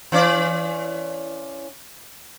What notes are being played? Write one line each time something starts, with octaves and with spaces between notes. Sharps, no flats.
E3 C#4 D5